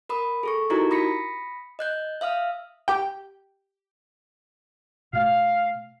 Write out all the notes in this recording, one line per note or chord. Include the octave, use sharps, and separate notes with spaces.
A#4 B5 D#6
G#4 A4 C#6
D#4 E4 F#4 G4 A#4 A#5
B5 D#6 A#6 B6 C#7
D#5 F#6 G6
E5 F5 D#6 F6
G4 G5
B2 A3 F5